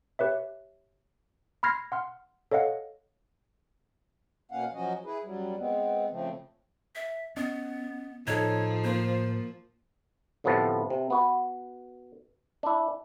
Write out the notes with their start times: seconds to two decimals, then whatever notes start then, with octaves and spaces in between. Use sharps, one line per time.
0.19 G4 B4 C#5 E5
1.63 B5 C6 F6 G#6 A#6 C7
1.92 F#5 C6 F6
2.51 A4 C#5 D#5 F5 F#5
4.51 B2 A#3 C#4 F5 F#5
4.74 F3 F#3 C#4 F#4 D#5
5.05 E4 G#4 B4
5.24 F#2 F#3 G3
5.58 G#3 B3 C4
6.10 C#3 F3 A3 C4
6.95 E5
7.37 B3 C#4 D#5
8.27 A2 F3 D#4 A4 C#5
8.84 A#3 C5 C6
10.44 D2 A2 C3 F3 B3 A5
10.90 C3
11.10 B3 F#4 B4
12.63 D4 E4